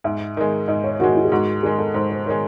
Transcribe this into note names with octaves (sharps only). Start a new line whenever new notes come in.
G#2 E5
D#3 G#3
G#2 D#5
C#5
D#3 G#3 F#4
E4
G#4
G#2 F#4
D#3 G#3 G#4
A4
G#2 C5
C5
D#3 G#3 C#5